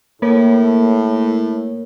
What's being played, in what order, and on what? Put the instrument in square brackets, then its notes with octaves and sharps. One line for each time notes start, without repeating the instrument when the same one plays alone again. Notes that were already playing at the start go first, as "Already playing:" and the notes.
[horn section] A2 [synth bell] A#3 A#4 C#5